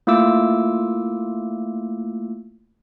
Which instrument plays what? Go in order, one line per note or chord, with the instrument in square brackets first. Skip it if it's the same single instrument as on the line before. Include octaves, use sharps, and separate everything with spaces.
[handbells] A3 A#3 E4 F4 D6 E6